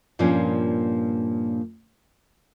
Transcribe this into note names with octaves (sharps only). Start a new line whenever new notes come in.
G2 A#2 F3 A#3 C#4 D4